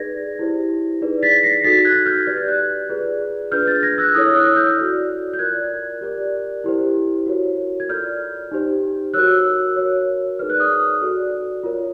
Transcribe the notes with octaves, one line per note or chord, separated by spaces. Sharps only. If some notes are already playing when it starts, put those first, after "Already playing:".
Already playing: D#4 G#4 B4 D5 G#6 A#6
E4 G4 C5
D#4 G#4 B4 D5
A6 B6
A#6 C7
D#4 F#4 A4 A6 B6
F#6 G#6
F6 G6
G4 B4 D5 G#6
G6
F#6 G#6
F4 G#4 B4 D5
D4 F4 G#4 B4 F6 G6
G6 A6
G#6 A#6
E6 F#6
E4 A4 C#5 D#6 F6
E6 F#6
F6 G6
F#4 A4 D5
G6
F4 A#4 D5 F#6 G#6
G4 A#4 D5
E4 G4 C5
F#4 A#4 C#5
G#6
F4 A4 D5 F6 G6
D#4 G4 C5
F#4 A#4 C#5 E6 F#6
F#4 A#4 C#5
D#4 G#4 B4 D5 F6
F#6
D#6 F6
F#4 A4 D5
F4 A#4 C#5